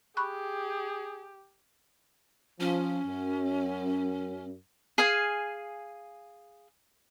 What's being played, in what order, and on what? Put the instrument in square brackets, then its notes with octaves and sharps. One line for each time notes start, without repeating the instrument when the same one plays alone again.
[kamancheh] G4 [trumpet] G#4 [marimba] B5 C#6 F#6
[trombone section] F3 [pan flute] C#4
[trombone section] F#2
[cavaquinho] G#4 F5 G#5